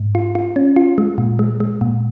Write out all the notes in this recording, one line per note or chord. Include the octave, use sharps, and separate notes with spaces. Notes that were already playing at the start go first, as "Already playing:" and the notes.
Already playing: G#2
F4
F4
C#4
F4
G#3
A#2
G#3
G#3
A#2